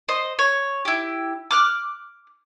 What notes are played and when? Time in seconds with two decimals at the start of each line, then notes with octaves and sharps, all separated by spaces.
0.08 C5 D#5
0.39 C#5
0.85 E4 G4
1.51 D6 F6 F#6